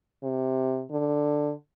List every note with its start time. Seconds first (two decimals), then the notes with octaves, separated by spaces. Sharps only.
0.23 C3
0.91 D3